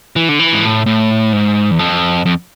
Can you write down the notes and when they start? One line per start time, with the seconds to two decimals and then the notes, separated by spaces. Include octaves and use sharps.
0.16 E3
0.29 D3
0.39 E3
0.53 G#2
0.63 A2
0.86 A2
1.33 G#2
1.71 E2
1.79 F2
2.26 F2